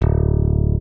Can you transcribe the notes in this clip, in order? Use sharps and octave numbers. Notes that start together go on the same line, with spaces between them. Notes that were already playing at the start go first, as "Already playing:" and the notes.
D1